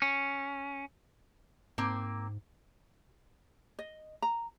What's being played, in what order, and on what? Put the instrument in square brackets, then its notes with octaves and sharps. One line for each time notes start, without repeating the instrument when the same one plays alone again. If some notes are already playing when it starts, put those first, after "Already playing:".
[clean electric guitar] C#4
[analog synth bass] G#2 [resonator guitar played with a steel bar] A#3 C4
[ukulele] D#5
A#5